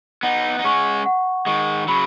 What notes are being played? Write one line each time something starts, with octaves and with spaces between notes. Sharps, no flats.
B3 D#4 F#5
D#4
G#3 C#4 C#6
F#5
D#3 G#3 C#6
C#3 F#3 B5